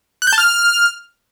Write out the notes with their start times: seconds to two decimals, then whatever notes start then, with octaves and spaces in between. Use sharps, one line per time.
0.22 F#6
0.27 G6
0.33 A5
0.38 F6